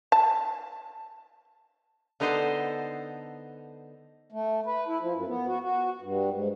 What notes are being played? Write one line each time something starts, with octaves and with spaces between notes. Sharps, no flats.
A5
D3 B3 D#4 A4 C5
A3
B4
E4
F3
F#2
B3
F#4
F#4
G2
G#2